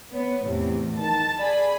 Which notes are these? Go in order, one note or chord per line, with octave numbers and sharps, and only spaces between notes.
B3 C#5
E2 A2 C3
D#3 A5
G#4 D5 G#5 B5